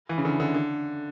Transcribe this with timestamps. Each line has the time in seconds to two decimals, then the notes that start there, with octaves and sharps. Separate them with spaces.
0.09 E3
0.18 C#3
0.25 D3
0.40 D3
0.54 D3